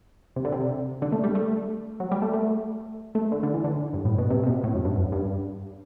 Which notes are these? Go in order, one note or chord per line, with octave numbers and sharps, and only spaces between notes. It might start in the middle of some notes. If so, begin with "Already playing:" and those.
C3
D3
C3
D3
A3
G3
A3
F#3
G3
A3
A3
A3
D3
D3
E3
D3
G2
A2
B2
C3
C3
B2
A2
F#2
G2
F#2
G2